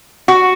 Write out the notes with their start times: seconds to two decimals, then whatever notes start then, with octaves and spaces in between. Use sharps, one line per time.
0.28 F#4